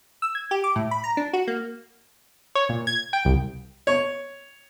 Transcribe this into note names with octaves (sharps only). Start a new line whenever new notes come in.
E6
G#6
G4
D6
A2
B5
A#5
D4
F#4
A#3
C#5
A#2
G#6
G5
C2
C#5